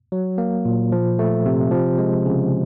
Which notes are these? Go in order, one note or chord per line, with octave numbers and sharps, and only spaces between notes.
F#3
A#3
A#2
F3
A3
C3
F3
G#3
C#3